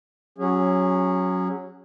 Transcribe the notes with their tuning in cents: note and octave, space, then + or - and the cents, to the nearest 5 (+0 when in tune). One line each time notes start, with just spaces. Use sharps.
F#3 -5 C#4 +0 G#4 -25